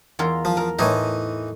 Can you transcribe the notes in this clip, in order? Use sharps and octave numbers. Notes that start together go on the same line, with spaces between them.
E2 F4 A#4
F3
A#4
A2 E3 D#4